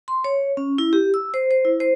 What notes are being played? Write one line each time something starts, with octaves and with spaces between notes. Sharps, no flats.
C6
C#5
C#4
E4
G4
E6
C5
C5
E4
C5